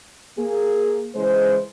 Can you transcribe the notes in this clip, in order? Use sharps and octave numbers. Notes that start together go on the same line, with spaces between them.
A#3 G#4
C#3 E3 G#3 C5